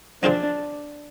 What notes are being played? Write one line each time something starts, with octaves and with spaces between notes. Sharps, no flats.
F3 C4 D4 F4 G#4 C5